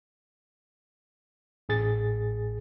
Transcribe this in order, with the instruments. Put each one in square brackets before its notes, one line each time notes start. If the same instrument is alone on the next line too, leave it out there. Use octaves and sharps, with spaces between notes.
[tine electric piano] A1 G#4 A6